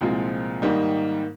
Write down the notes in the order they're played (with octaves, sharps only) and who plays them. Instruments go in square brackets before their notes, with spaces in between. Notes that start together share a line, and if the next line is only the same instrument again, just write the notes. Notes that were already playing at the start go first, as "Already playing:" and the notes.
[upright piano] C2 A#2 F3 G#3 C4
G#2 D#3 G3 A#3 D#4